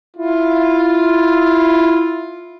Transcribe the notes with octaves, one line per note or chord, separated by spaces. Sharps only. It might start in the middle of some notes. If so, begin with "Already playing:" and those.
E4 F4